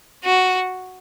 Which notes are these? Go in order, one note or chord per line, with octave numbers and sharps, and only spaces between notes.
F#4